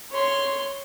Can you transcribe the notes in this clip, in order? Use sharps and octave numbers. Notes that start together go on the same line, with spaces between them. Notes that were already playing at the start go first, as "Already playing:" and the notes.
C#5 C6